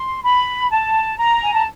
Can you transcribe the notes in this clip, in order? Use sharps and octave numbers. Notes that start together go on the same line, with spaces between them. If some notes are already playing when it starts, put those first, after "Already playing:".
Already playing: C6
B5
A5
A#5
G#5
A5